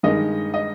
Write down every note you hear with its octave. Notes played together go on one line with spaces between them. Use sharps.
G2 D#3 G#3 D#5
D#5